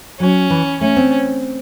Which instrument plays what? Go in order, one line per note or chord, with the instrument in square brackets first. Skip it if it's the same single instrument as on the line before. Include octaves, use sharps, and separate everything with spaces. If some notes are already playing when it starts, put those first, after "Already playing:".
[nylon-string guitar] F#3 [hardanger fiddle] C#4
[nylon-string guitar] E3
[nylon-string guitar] A3 [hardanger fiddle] C#4
[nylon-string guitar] C4